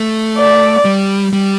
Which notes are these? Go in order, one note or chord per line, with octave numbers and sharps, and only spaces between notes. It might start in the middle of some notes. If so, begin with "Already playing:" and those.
Already playing: A3
D5
G3
G3